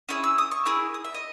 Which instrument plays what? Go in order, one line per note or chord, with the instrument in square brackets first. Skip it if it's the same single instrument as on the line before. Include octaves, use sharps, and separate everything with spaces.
[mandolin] C#4 E4 G#4
E6
D#6
C#6
A#3 E4 G#4 E6
D#6
E5
D#5